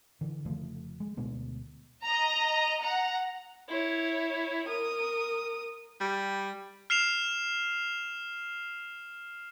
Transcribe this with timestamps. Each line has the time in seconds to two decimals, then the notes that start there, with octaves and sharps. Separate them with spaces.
0.21 D3 E3
0.45 F1 C#3 F3 A3
1.00 G#3
1.17 D2 B2 G#3 B3
2.04 D#5 A#5
2.82 F#5 A#5
3.69 E4 C#5
4.68 A#4 D#6
6.00 G3
6.90 F6 C7 E7 F7